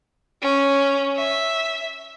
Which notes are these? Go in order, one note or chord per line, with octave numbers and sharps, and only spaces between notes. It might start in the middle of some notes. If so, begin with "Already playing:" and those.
C#4
E5